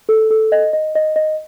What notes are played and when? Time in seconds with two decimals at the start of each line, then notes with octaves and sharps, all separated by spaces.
0.09 A4
0.31 A4
0.52 D#5
0.73 D#5
0.95 D#5
1.16 D#5